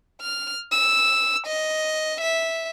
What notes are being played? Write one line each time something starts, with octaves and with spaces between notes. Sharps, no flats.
F6
E6
D#5
E5